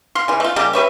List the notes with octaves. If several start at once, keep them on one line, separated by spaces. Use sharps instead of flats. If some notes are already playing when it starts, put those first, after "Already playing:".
F5 C6
C#3 E3
A3 F4
C#3 G3 A#3 G4
G4 B4 C#5 E5